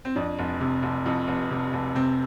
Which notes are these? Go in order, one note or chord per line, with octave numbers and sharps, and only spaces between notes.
C4
F2 D4
F1
C3
F1
F2
F1
C3
F1
C3 C4